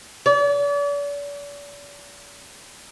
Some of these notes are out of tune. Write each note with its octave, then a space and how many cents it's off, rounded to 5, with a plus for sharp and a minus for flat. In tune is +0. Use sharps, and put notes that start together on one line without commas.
D5 -40